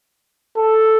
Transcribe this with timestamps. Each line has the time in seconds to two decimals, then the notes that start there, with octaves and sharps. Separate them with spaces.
0.57 A4